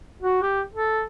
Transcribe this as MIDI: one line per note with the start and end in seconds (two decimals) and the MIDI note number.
0.22 0.41 66
0.42 0.61 67
0.73 1.04 69